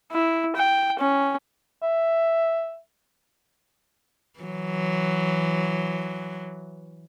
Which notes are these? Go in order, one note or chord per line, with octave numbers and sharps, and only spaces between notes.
E4
G5
C#4
E5
E3 F#3